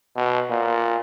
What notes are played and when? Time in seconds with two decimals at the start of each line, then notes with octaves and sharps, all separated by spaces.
0.16 B2
0.50 A#2